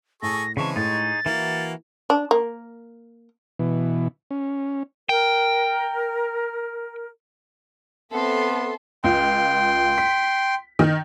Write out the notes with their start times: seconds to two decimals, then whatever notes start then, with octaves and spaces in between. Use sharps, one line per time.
0.22 A2 G#4 A4 C#6 A#6
0.57 C#3 E3 G#3 C4 A5 C#6
0.76 A2 D#4 G#4 C#6 A6
1.26 E3 A#3 E4 F#4
2.10 D4
2.31 A#3
3.59 B2 E3
4.31 C#4
5.09 A#4 G5
8.13 B3 C4 A4 E5 C6
9.04 C#2 F4 G5 C6
9.98 B6
10.79 D#3